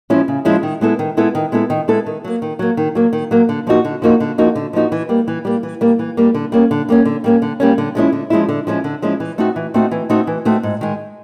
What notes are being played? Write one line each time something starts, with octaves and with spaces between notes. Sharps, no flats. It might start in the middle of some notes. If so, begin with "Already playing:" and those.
F3 G#3 C#4 E4
C#3
F3 G#3 C#4 E4
D#3
G#3 B3 E4 A4
D#3
G#3 B3 E4 A4
D#3
G#3 B3 E4 A4
D#3
G#3 B3 E4 A4
D#3
F#3 A#3
D#3
F#3 A#3
D#3
F#3 A#3
D#3
F#3 A#3
D3
F3 A#3 D#4 F#4
D3
F3 A#3 D#4 F#4
D3
F3 A#3 D#4 F#4
D3
F3 A#3 D#4 F#4
E3
G3 A#3
E3
G3 A#3
E3
G3 A#3
E3
G3 A#3
D3
G3 A#3 C#4
D3
G3 A#3 C#4
D3
G3 A#3 C#4
D3
G3 A#3 C#4
D3
F3 G#3 C#4 E4
D3
F3 G#3 C#4 E4
D3
F3 G#3 C#4 E4
D3
F3 G#3 C#4 E4
E3
A3 C4 D#4 F#4
E3
A3 C4 D#4 F#4
E3
A3 C4 D#4 F#4
E3
A3 C4 D#4 F#4
G#2
D#3 G#3